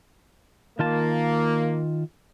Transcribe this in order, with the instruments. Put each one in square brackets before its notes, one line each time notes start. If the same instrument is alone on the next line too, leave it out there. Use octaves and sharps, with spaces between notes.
[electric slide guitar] D#3 F4 A5 [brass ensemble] A#3